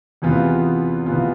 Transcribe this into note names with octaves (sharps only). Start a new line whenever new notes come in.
E2 C3 E3 B3 F4
C3 E3 B3 F4